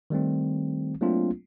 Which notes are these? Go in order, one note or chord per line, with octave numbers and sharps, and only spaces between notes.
D#3 G3 A3 C4
F#3 A3 A#3 C4 D4 F4